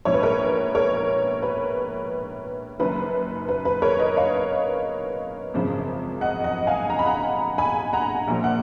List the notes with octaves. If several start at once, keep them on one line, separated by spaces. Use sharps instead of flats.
A#1 G#2 F3 C#5
B4
A#4 C#5
A#4 C#5
B4
F#1 F#2 D#3 B4
B4
B4
A#4 C#5
B4 D#5
C#5 F5
G#1 F#2 C#3 F3
D#5 F#5
D#5 F#5
F5 G#5
A#5
B5
F#5 A#5
G#5 B5
F#5 A#5
A#1 A#2 F3
F#5